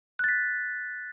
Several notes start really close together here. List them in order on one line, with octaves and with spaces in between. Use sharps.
F#6 A6 B6